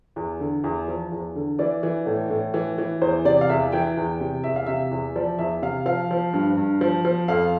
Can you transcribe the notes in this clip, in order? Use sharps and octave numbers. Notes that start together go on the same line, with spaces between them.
E2
D3
E2
F3
E2
D3
E3 D5
E3
A2
A2
E3
E3
E2 C5
C3 D5
F5
E2 E5
E3 G5
E2
C3
E2 E5
F5
C3 E5
E2
F3 D5
E2 E5
C3 F5
F3 F5
F3
G2
G2
F3
F3
F2 F5